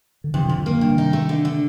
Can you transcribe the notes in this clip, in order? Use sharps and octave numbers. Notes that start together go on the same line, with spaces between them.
D3
F2 C3 D#3
D3 F3
F2
D3 F3
D#3 A#3
G2 D3
C3 D#3
D#4
A3
D3
D3